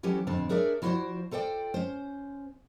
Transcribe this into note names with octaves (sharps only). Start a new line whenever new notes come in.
E3 F#3 C#4 G4 A4
F2 A2 D3 C4 A5
D4 G#4 A#4 C#5 D5 E5
F3 E4 F#4 A#4 C5 D5
F4 A4 C5 D5 G5
C#4 C5